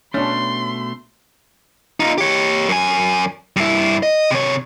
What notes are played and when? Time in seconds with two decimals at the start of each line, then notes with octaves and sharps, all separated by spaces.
0.14 B2 A3 C#4 D4 C6
2.00 D#4 F4
2.18 G4 C#5
2.69 F#2 G#5
3.56 G2 E4
4.03 D#5
4.30 C3 C#5